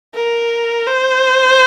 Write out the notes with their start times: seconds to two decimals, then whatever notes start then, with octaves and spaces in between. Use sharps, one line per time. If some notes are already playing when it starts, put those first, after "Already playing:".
0.15 A#4
0.87 C5